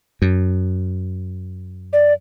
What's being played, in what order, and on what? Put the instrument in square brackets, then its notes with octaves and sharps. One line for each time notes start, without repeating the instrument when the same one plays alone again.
[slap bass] F#2
[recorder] D5